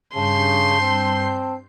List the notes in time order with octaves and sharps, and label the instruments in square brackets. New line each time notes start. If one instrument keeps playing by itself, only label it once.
[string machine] G2 G6 C7 [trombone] C#3 [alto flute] A5 [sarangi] C6
[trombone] C4